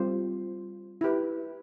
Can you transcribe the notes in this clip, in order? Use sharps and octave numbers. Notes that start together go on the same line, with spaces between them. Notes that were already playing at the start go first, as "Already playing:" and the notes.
Already playing: G3 C4 F4 C5
E4 G4 B4